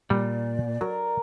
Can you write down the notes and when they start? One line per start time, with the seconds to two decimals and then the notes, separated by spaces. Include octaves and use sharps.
0.10 A#2 G3 D5
0.81 F#3 A#4